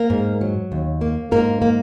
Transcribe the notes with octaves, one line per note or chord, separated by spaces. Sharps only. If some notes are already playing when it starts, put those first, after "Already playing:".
Already playing: A#3 A#4
G#2
F#3
D#2
A#3
G#2 A#3 A#4
A#3